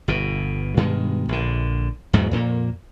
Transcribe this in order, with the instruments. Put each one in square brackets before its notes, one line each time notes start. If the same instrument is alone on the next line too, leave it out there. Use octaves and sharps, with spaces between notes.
[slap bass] G1 B2
G2 B2 D#3 G#3
A#1 D3
E2 G#2 B2 F#3
F2 A#2 A3 A#3